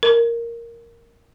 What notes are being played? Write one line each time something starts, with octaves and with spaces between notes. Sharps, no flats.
A#4